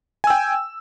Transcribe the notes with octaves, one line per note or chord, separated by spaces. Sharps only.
G5 G#5 E6